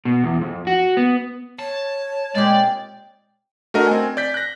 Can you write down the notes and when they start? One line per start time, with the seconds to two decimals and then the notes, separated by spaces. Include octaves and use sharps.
0.05 B2
0.24 E2
0.41 F2
0.67 F#4
0.97 B3
1.59 C#5 A5
2.35 A#2 G#3 C4 G4 D5
3.74 A3 D4 F#4 A#4 D#5
3.87 C4 G#5
4.17 D5 G6 B6
4.34 F#6 A#6